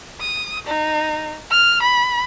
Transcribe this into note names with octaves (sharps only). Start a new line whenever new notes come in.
D#6
D#4
F6
B5